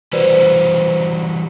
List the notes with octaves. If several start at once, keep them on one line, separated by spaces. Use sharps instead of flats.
E3 G3 F#4 B4 C5 D5